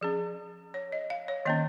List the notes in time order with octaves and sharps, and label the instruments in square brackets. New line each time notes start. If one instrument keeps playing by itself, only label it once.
[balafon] F3 C#4 G#4
C#5
D#5
F5
C#5
D#3 A#3 C#4 D#5